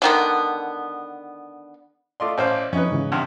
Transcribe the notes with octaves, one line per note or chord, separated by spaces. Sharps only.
D3 D#3 B3
A3 F4 D5 D#5 C6 D6
A1 C5 F5
F2 C#4 D#4 B4
G#2 C#3 E3
G2 C3 F#5 F6